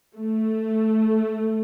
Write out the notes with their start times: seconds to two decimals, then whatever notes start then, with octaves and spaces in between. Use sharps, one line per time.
0.17 A3